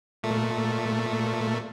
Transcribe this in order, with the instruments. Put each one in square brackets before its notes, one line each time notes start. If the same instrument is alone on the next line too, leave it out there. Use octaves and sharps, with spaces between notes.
[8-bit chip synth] A#2 A3